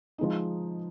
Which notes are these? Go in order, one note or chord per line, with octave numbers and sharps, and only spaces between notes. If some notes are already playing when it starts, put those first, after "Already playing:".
F3 G#3 D#4